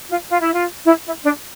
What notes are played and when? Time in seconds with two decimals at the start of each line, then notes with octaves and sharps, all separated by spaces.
0.10 F4
0.28 F4
0.40 E4
0.53 F4
0.85 E4
1.04 E4
1.23 D4